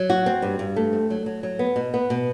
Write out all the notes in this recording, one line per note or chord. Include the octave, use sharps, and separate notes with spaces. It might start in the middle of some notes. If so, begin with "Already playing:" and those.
Already playing: F#3
F#4
C4
G2
G2
A3
C4
F#3
F#3
F#3
B3
B2
B3
B2